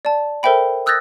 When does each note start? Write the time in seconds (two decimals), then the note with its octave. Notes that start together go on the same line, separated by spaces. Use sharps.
0.05 D5 A5
0.43 A4 A#4 C5 E5 G5 B5
0.86 D#6 E6 F#6 G6 A6 A#6